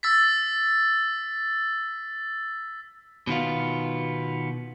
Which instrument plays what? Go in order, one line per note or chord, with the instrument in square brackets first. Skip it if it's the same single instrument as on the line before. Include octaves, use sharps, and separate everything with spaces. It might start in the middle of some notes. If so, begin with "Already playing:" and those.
[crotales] E6 A6 B6
[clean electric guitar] B2 D#3 B3 F4